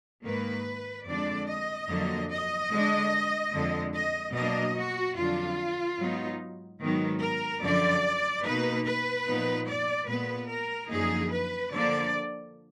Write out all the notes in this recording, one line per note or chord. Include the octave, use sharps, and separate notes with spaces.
G#2 D#3 A#3 B4
F2 D3 G#3 D4 D5
D#5
F2 D3 F#3 A#3
D#5
D3 G#3 D4
F2 D3 G#3
D#5
B2 F#3 A#3 D4 D#5
F#4
F2 D3 F#3 D4 F4
G#2 F#3 B3 D#4
G#2 D#3 F#3 B3
A#4
F#2 D3 F3 D5
B2 A#3 D#4 B4
B4
A#2 F3 B3 D#4
D5
A#2 G#3 B3 B4
A#4
F#2 D3 F3 A#3 D#4 G#4
B4
D3 F3 A#3 D5